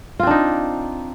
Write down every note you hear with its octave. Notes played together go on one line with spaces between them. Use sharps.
C4 D4 D#4 F4